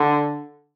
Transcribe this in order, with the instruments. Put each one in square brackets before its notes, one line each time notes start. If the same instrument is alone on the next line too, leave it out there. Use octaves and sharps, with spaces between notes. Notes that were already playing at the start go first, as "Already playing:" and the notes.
Already playing: [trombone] D3